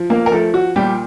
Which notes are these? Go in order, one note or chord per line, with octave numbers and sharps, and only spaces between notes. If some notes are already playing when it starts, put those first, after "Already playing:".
Already playing: F3
A#3 A#4
A#4
F3 A3 A4
F#4
A#2 G3 G4